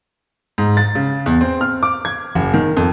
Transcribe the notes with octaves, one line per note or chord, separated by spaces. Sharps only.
G#2
A6
C#3
E2
C4
F6
D6
G#6
F#1
D#3
F2